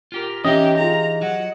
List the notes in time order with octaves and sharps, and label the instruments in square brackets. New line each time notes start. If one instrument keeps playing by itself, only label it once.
[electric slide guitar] F4 G4 A#4
[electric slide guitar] E3 D#4 [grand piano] C#4 E5 [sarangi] G4 [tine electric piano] D#5
[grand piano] F4 G#4 [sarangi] A#5
[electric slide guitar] F#3 [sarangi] F#5